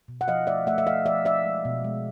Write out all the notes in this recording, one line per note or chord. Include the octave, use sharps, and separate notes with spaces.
B2
F#5
F3 D#5 F5
A3 D5 E5
A3 E5 F#5
E5
F3 D#5 F5
F3 D5 E5
A3 D5 E5
G#3
B2
G#3